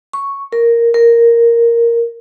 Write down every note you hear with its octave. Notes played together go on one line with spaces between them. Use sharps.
C#6
A#4
A#4